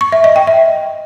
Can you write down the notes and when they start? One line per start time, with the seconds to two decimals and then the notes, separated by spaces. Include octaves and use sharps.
0.01 C#6
0.12 E5
0.24 D#5
0.36 G5
0.47 E5